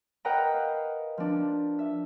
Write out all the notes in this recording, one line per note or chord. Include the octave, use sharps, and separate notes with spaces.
A#4 B4 D#5 F#5 G5 A#5
F5
F3 D4
E5